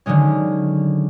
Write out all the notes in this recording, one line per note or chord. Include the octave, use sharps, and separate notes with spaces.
D3 D#3 F#3 G#3 C#4